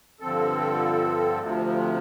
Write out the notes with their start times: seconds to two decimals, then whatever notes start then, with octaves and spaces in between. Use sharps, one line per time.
0.20 G2 D3 F3 C4 A4
1.40 D2 C3 F3